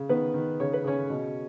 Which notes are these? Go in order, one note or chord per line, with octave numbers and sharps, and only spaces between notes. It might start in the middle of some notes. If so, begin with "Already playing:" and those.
Already playing: C#3
D#3 B3 B4
D#3
C#3 C#5
B4
C#3 C#4 C#5
B2